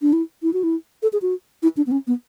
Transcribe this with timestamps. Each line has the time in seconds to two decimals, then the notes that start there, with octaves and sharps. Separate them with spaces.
0.02 D4
0.13 E4
0.43 E4
0.53 F#4
0.63 E4
1.03 A4
1.13 G#4
1.22 F#4
1.63 E4
1.77 D4
1.87 B3
1.92 C#4
2.07 B3